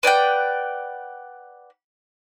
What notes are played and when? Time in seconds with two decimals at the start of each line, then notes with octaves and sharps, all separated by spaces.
0.03 B4 D5 F#5 G5